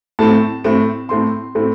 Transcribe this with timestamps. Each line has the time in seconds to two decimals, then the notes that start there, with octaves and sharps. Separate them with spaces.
0.19 A2 A3 C4 A5
0.64 A2 A3 C4
1.09 A2 A3 C4 C6
1.55 A2 A3 C4